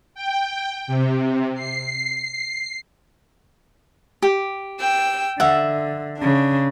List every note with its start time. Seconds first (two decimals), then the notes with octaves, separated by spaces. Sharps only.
0.15 G5
0.87 C3
1.55 C7
4.22 G4
4.79 G5 E6
5.40 D3 E5 F#5
6.19 C#3 D4